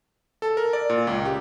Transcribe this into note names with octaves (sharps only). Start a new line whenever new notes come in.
A4
A#4
D5
A#2
C#2
G4